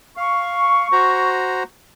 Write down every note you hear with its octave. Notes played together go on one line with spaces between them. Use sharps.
F5 C#6
F#4 C5 A#5